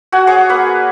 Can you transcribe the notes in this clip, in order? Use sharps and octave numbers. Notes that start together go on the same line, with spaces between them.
F#4 F#5 G#5
G#4 C#5 G#5 D6
A#3 B4